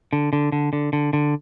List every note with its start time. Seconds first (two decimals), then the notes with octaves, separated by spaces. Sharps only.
0.13 D3
0.33 D3
0.52 D3
0.73 D3
0.93 D3
1.13 D3